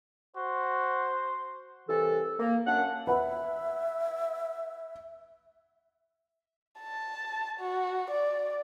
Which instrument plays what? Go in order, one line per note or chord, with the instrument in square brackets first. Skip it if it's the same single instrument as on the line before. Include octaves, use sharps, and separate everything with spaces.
[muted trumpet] F#4 [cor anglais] C5
[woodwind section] C2 E3 A4
A#3
F#2 D4 F#5
[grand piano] B4 F#5 B5 [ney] E5
[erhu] A5
F#4
D5